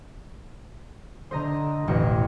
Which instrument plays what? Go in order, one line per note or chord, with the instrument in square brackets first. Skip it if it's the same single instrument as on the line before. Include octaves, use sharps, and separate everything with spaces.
[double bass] D3 [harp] C5 D#5 A#5
[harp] E1 A1 C#7 [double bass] E3